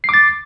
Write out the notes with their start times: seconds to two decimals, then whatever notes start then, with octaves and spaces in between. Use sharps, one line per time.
0.04 C7
0.09 D6
0.14 A6